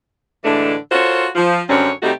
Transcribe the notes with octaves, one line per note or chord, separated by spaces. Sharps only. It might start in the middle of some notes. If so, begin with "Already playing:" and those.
A2 D3 E3 G#3 A3 D4
F4 F#4 A4 A#4 C5 C#5
F3
F#2 D3 G3 C4 C#4 C#5
C3 G3 A3 D#4 F#4 G4